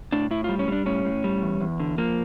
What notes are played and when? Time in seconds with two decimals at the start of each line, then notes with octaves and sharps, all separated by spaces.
0.12 A2 D4
0.31 A2 E4
0.44 G3 F4
0.59 C#4
0.68 G3 D4
0.86 A2 C#4
1.05 A2
1.24 G3
1.42 E2
1.61 E2
1.80 D3
1.98 F3 A#3